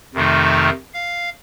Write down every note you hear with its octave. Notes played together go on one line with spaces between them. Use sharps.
F2 C3 D#3 A3 D#4
F5